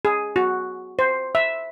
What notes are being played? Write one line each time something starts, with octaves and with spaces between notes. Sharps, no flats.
G#4
F#4
C5
E5